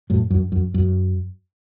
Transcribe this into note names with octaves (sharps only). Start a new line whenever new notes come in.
F#2 A2
F#2
F#2
F#2